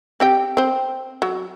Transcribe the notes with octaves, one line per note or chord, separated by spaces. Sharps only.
C4 G4 G5
C4 C5
F#3